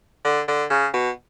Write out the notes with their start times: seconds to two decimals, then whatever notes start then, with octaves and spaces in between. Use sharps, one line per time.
0.25 D3
0.48 D3
0.70 C#3
0.94 B2